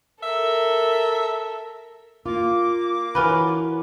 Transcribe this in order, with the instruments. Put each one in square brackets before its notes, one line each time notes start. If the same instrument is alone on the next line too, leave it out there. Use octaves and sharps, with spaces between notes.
[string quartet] A4 A#4 [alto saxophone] E5
[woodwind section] A#3 D6 [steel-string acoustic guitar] F4
[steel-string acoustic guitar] E3 F#4 A#4 [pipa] C#4 F4 B4